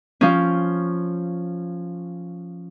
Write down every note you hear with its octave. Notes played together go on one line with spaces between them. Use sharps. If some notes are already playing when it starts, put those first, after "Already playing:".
F3 C#4